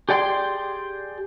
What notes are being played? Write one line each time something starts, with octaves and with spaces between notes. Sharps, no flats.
G4 G#4 D5 G5 C6